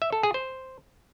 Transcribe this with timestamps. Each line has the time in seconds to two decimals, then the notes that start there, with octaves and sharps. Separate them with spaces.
0.02 E5
0.13 A4
0.23 G#4
0.34 C5